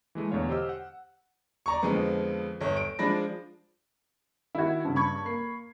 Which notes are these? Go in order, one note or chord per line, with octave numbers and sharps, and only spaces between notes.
E3 G#3 A3
E2 B2 D3 C#5 F5
G4 C5 D#5 E6 F6
F#5
D5 A#5 C#6
F2 D3 F3 G#3 B3
G1 C#5
D7
F3 G#3 D4 B5 A#6
D#3 E4 F#4 G#6
G2 C#3
B5 C#6 G#6
A#3 C7